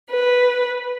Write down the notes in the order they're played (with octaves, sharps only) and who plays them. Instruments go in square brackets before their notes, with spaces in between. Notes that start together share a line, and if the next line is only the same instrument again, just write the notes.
[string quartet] B4